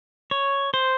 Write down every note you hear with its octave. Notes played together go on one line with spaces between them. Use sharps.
C#5
C5